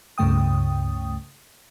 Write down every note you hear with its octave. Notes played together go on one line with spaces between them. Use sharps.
C#2 G2 C#3 A3 G5 D#6